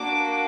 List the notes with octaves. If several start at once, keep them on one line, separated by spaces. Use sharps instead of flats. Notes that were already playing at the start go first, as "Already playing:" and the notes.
Already playing: A#3 D4 F#4 D6